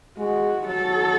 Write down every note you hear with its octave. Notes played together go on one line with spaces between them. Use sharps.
G#3 F#4
F#3 A4